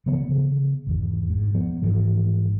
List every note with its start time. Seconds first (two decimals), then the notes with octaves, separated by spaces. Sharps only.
0.06 C#3 E3 F3 B3
0.29 C#3
0.87 G#1 E2
1.30 G#2
1.55 F3 B3
1.82 G#1 G#2 E3 F3